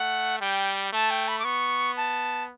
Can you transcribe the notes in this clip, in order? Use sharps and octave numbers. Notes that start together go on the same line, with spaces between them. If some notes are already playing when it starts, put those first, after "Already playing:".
Already playing: A3 F#5
G3 G5
A3 A5
G5
B5
D6
B3 C#6
A5